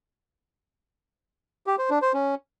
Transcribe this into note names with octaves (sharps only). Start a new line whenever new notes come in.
G4
C5
D4
C5
C#4